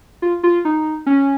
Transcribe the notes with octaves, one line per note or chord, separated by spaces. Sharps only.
F4
F4
D#4
C#4